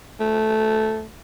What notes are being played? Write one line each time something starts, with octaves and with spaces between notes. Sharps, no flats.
A3